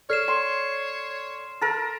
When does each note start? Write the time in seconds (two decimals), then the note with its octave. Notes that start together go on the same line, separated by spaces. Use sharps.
0.10 A4 C#5 D5 F6 C7 E7
0.28 C6
1.61 A4 A#4 A6